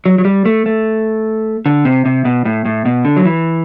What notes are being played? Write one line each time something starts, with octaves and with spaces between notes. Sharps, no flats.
F#3
F#3
G3
A3
A3
D3
C3
C3
B2
A2
A2
B2
D3
F#3
E3